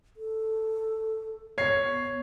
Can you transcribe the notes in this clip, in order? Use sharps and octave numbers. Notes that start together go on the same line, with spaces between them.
A4
B3 C#5 C7